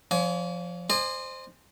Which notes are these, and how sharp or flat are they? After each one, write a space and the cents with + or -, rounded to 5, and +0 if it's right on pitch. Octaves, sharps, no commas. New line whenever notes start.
F3 +5 D5 -45 G#5 +20
C5 +0 D#5 -45 G#5 -10